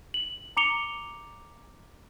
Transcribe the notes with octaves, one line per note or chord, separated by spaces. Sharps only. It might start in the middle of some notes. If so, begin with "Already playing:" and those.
F#7
A#5 D6 C#7 F7 G7